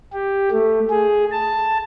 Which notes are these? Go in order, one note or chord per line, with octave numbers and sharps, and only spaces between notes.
G4
A3
G#4
A5